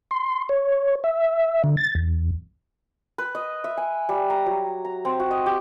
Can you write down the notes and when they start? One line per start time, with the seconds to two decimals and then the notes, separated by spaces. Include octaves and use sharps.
0.11 C6
0.49 C#5
1.04 E5
1.64 D3
1.77 A6
1.95 E2
3.18 B4
3.35 D#5
3.64 E5
3.77 G#5
4.09 G3
4.30 A#5
4.46 F#3
4.85 A#5
5.05 C4
5.20 F#4
5.31 D#5
5.46 G4